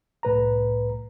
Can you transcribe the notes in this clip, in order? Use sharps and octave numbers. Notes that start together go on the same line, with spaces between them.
C2 A2 B4 A#5